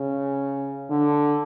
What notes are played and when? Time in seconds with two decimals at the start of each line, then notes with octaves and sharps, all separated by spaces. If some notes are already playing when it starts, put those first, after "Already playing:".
Already playing: C#3
0.90 D3